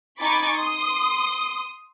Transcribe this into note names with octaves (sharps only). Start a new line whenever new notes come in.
D#4 G#5 B5 C#6 D6 A6
C6 D#6